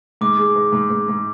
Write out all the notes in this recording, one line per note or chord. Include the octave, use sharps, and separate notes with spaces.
G#2 D6
G#3
G#2
G#2
G#2
G#2